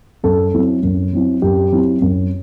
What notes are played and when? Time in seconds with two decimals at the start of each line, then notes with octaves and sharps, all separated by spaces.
0.23 F#2 A4
0.54 F#3 C4 E4
0.83 F#2
1.13 F#3 C4 E4
1.42 F#2 G4
1.72 F#3 C4 E4
2.02 F#2